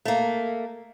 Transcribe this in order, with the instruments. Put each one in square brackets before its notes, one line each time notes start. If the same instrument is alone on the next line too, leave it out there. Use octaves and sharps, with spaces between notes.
[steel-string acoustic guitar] A3 A#3